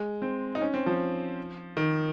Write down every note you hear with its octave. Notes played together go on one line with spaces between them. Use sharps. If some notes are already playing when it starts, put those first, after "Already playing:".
Already playing: G#3
C4
D#4
C#4
C4
F3
D#3